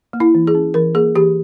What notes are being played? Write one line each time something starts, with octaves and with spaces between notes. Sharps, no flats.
A#3
E4
E3
G#4
C#4
E3 A#4
A#3 G#4
E3 G4